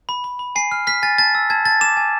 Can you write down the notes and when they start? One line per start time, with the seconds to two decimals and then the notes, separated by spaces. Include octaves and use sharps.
0.09 B5
0.24 B5
0.39 B5
0.56 G#5 C7
0.71 F6
0.87 F6 B6
1.03 G#5 A6
1.18 A5 A6
1.35 E6
1.50 A5 G#6
1.65 A5 A6
1.81 D6 E7
1.97 G#5